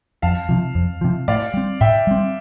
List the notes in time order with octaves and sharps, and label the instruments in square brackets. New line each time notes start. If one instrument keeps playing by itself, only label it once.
[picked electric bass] F2 [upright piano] F5 A5
[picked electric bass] C3 F3
F2
C3 F3
[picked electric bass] A2 [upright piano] D5 F5
[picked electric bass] G3 C4
[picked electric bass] A2 [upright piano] E5 G5
[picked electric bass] G3 C4